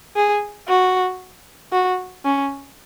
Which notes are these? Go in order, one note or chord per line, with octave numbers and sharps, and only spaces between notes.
G#4
F#4
F#4
C#4